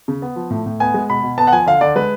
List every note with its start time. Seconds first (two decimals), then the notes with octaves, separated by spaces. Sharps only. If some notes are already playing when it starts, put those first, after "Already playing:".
0.08 C#3
0.22 B3
0.36 F3
0.50 A2
0.66 A2
0.80 B3 G#5
0.94 G#3
1.10 B2 B5
1.23 B2
1.38 B3 A5
1.47 F#5
1.52 F3 G#5
1.66 D3 F5
1.81 D3 D5
1.96 G#3 B4